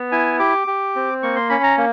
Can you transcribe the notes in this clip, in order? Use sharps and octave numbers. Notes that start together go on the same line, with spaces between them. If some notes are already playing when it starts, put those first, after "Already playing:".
Already playing: B3
E4 G#5
G4 D6
G4
C4
A#3 C#6
C6
C#4 B5
A#5
A#3